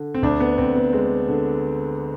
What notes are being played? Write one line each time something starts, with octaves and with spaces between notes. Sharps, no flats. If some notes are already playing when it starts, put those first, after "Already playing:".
Already playing: D3
C4
D2 D4
B3
D2 C4
B3
G#3 C4
D3